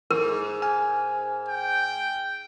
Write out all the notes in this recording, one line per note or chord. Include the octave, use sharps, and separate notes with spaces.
G#2 A#4
G#5 F6
G5